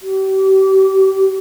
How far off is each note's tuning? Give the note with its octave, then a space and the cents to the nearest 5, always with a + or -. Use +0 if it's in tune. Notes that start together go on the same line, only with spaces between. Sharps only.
G4 -35